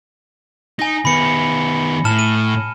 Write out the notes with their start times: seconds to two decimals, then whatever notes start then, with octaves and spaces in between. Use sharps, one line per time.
0.79 D#4 G#5 A#6
1.05 D#3 B3 B5 C#7
2.05 A2 A5 F6 E7
2.19 D#7